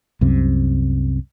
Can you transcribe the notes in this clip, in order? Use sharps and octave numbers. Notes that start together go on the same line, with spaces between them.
C2 F#2 C3